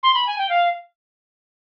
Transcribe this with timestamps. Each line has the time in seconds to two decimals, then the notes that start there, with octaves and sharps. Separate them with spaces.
0.03 C6
0.14 B5
0.27 G#5
0.38 G5
0.49 F5